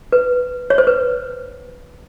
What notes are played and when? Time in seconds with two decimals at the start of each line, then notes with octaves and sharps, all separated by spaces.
0.12 B4
0.70 C#5
0.78 C5
0.87 B4